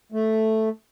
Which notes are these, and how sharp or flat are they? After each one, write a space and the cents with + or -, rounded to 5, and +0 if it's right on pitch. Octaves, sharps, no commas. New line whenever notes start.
A3 +0